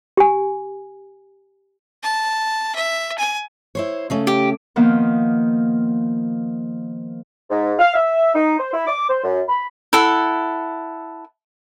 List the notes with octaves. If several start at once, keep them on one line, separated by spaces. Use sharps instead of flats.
G4 G#5
A5
E5
G#5
E4 C5 C#5
C#3 A3 C#4
G4
D#3 F3 A#3 B3
G#2
F5
E5
D#4
C5
E4
D6
C5
F#2
B5
E4 A4 F#5